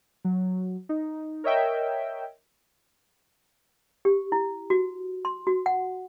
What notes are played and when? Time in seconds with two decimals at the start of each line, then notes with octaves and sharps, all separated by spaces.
0.25 F#3
0.89 D#4
1.44 A#4 C#5 D#5 E5 G5
4.05 G4
4.32 E4
4.70 F#4
5.25 C6
5.47 F#4
5.66 F#5